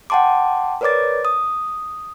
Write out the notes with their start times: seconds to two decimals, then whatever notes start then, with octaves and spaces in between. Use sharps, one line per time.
0.10 F#5 G5 A5 C6 D6
0.81 A#4 B4 C#5 D5 D6 A6
1.25 D#6